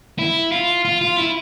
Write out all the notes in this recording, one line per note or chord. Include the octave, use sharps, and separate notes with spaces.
E4
F4
F4
F4
E4